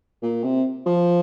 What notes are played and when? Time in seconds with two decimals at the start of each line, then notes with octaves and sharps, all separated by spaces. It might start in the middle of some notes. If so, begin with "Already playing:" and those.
0.23 A#2
0.44 C3
0.86 F3